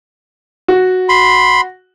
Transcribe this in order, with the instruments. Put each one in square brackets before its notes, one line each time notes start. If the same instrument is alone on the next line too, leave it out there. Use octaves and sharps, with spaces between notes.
[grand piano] F#4
[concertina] B5 C6